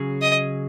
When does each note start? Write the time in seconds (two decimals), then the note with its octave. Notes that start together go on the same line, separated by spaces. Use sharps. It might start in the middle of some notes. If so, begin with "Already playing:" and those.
Already playing: C#3 F#3 C#4 G#4
0.22 D#5